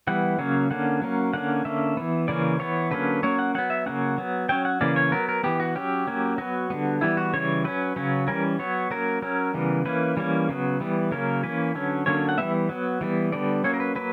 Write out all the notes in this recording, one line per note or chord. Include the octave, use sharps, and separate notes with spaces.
E3 G3 B3 F#5
C#3 F#3 A#3 C#4
D3 A#3 C#4 F#5
F#3 A#3 C#4
D3 A#3 C#4 F#5
D3 A#3 C#4 E5
E3 B3
C#3 E3 A#3 C#4 D5
E3 B3 C#5
D3 F#3 A#3 C#4 B4
F#3 A#3 C#4 C#5
F#5
F#3 B3 F#5
E5
C#3 F#3 A#3 C#4 F#5
F#3 B3
F#3 C#4 G5
F#5
C#3 E3 A#3 C#4 D5
C#5
F#3 B3 A#4
A#4
E3 B3 G4
F#4
F#3 C#4 G4
F#3 A#3 C#4
F#3 B3 F#4
D3 G3 B3
E3 G3 B3 E4
F#4
C#3 E3 G3 C#5
F#3 C#4 B4
C#3 F#3 C#4
E3 G3 C#4 A#4
F#3 B3 C#5
F#3 A#3 C#4 A#4
F#3 C#4 A#4
C#3 E3 G3 B3
E3 A#3 C#4 B4
E3 G3 A#3 C#4
C#3 F#3 B3
E3 G3 B3
C#3 F#3 A#3 C#4 A#4
E3 A#3 C#4 B4
D3 F#3 C#4
D3 F#3 A#3 C#4 C#5
F#5
E3 G3 B3 E5
F#3 B3
E3 G3 B3
D3 G3 B3 D5
F#3 A#3 C#4 C#5
A#4
B4
F#3 A#3 B4